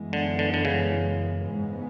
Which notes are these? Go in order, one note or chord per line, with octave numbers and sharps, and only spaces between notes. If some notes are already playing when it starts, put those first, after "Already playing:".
Already playing: F#2 E3 G#3 B3
D3
D3
D3
C#3
G#2 G#3 B3